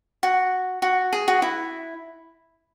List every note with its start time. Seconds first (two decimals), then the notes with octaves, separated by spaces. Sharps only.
0.23 F#4
0.82 F#4
1.13 G#4
1.28 F#4
1.42 E4